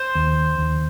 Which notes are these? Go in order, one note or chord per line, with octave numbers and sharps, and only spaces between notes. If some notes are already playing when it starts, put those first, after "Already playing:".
Already playing: C5
D#2
D#2